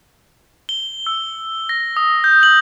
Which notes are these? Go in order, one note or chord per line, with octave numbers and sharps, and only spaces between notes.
G7
E6
A#6
D#6
G6
F#7